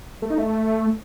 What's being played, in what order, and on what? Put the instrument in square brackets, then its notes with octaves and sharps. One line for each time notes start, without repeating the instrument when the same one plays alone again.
[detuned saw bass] A3
D#4
A3